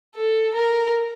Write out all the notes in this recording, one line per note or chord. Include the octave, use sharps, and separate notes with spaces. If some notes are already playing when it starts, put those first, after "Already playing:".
A4
A#4